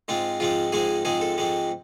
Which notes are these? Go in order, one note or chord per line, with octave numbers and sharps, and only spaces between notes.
G#2 G#3 C4 F4
G#2 F3 G#3 C4 F4
G#2 F3 G#3 C4 G#4
G#2 F3 G#3 C4 G#4
A4
G#2 F3 G#3 C4